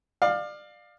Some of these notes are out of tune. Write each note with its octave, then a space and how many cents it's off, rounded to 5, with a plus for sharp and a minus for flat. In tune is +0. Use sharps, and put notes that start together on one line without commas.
D5 +30 F5 +10